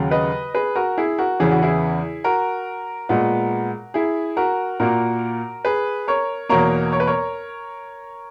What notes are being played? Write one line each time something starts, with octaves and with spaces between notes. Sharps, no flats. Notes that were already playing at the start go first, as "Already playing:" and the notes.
Already playing: D#2 C#3 F#3
B4 D#5
G#4 B4
F#4 A#4
E4 G#4
F#4 A#4
E2 C#3 E3 B3 G#4
F#4
E4 G#4
F#4 A#4
A#2 G#3 B3
E4 G#4
F#4 A#4
A#2 A#3 F#4 A#4
G#4 B4
A#4 C#5
E2 B2 A#3 A#4 C#5
C#5
B4
A#4 C#5